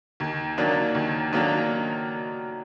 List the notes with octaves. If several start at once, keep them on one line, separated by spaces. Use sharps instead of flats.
D#2
D#3 F#3 A#3 D4
D#2
D#3 F#3 A#3 D4